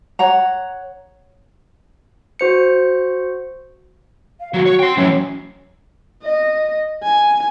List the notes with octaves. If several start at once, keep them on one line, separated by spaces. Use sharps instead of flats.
C#5 F#5 A#5
F#4 C5 C#7
F5
D#3 F#3 F#4
C#5
G5 C6
F#2 A2 E3 C#5
D#5
G#5